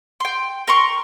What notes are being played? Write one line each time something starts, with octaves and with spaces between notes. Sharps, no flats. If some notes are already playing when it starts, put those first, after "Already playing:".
G5 C6
A#4 C6 C#6